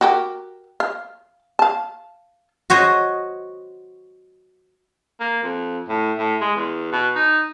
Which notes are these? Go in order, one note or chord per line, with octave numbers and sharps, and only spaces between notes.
F#4 G4 A#4
F5
F5 A5
F#4 C5 C#5 D#5
A#3
F2
A2
A2
G#3
E2
B2
D#4